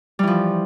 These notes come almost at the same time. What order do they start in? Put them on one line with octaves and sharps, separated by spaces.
G3 E3 F3